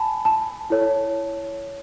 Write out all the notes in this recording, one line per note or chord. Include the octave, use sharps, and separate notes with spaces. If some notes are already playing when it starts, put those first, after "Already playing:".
Already playing: G#5 A5 B5
A5
E4 A4 C#5